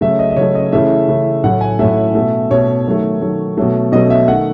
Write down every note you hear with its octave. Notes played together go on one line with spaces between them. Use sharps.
C#3 F#3 A3 E5
D#5
D#5
C#3 F#3 A3 C#5
D#5
C#3 E3 A3 E5
C#3 E3 A3
A2 F#3 A3 F#5
G#5
A2 F#3 A3 E5
B2 A3
B2 A3 C#5
D#3 F#3 A3
D#3 F#3 A3
B2 F#3 A3
B2 F#3 A3 D#5
E5
D#3 A3 F#5